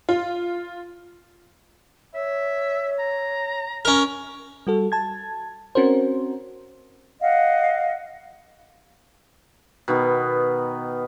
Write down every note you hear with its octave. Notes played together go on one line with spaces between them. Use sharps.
F4
C#5 E5
A#5
C#4 A#4
G3 F#4 A4
A5 G#6
C4 C#4 F#4 A#4 C5
D#5 F5 F#5
B2 D#3 B3